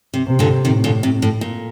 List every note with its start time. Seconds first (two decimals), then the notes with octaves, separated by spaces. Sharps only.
0.14 C3
0.27 C3
0.39 A#2 D3
0.65 A2 C3 D#3
0.84 A#2 D3
1.03 C3
1.22 A2
1.41 A#2